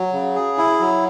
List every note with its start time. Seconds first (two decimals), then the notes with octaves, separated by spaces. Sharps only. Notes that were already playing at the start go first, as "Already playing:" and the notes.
Already playing: F#3
0.13 C#3
0.35 G#4
0.58 E4
0.80 F#3